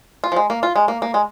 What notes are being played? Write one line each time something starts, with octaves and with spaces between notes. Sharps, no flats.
F4
F3
G#3
A#3
F4
G#3
A#3
A#3
G#3